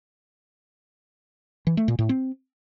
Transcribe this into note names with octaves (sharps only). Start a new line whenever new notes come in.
E3
A3
A#2
A2
C4